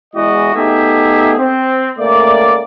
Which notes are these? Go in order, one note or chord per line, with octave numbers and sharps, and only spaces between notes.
E2 G#3 E4 F#4 D#5
A3 B3 D#4 G4 G#4 E5
C4
C#2 A3 A#3 D5